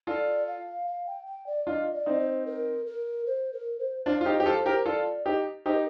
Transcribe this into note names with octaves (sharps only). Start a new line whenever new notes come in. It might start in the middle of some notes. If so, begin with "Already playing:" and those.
F4 A4 D5
F5
F5
G5
G5
D5
D4 F4 D#5
D5
C4 D#4
C5
A#4
A#4
C5
A#4
C5
D4 F4 C5
F4
D#4 G4
G4
F4 A4 C5
G4 A#4
F4 A4 D5
D#4 G4
D#4 G4 C5
A#4